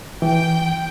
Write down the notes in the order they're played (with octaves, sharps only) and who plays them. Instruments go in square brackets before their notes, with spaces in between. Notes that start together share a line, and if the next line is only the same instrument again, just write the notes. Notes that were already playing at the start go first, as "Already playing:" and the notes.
[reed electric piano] E3 [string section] G5